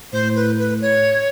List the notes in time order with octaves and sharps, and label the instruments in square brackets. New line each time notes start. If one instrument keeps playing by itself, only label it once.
[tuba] A2 [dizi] C5
[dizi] B4
B4
C#5